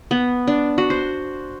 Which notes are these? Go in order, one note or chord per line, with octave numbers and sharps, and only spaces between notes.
B3
D4
F#4
C5